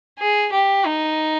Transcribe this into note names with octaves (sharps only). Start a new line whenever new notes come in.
G#4
G4
D#4